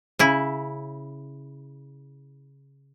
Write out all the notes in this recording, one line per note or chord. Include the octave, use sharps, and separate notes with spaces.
C#3 E4